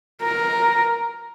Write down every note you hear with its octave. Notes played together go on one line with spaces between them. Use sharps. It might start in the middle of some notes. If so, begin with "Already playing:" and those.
A#4